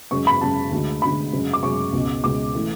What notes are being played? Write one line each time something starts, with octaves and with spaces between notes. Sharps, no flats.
F#2 C#3 G#3 C#6
B5
F#2 C#3 G#3 A5
D2 D3 G#3
D2 D3 G#3 B5
F#2 C#3 G#3
D6
F#2 C#3 G#3 C#6
C#2 B2 G#3
C#2 B2 G#3 D6
E3 A3